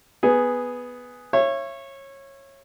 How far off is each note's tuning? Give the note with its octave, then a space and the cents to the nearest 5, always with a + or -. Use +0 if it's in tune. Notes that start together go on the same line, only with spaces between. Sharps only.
B3 +0 G#4 +0
C#5 -20 E5 +35